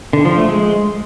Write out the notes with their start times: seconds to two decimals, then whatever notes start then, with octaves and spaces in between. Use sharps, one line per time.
0.13 D3
0.25 F3
0.37 A3
0.49 G#3